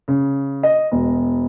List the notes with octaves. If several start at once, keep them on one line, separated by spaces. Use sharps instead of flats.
C#3
D#5
E1